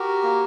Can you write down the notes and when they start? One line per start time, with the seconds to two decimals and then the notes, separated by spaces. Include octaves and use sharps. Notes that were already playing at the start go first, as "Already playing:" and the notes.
Already playing: F#4 G4 A#4
0.23 A#3